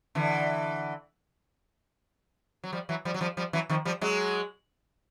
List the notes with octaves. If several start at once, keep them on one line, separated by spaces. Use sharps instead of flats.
D3 E3
F#3
F3 G3
E3 F#3
F3 G3
F#3
F3 G3
F3 G3
E3 F#3
D#3 F3
F3 G3
F#3 G#3